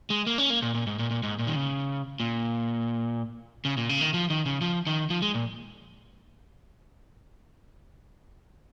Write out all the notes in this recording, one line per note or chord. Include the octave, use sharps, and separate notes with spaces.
G#3
A#3
C#4
A#3
A#2
A#2
G#2
A#2
A#2
G#2
A#2
D#3
C#3
A#2
C#3
A#2
C#3
D#3
F3
D#3
C#3
F3
D#3
F3
G#3
A#2